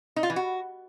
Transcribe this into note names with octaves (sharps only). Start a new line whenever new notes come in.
D#4
F4
E3
F#4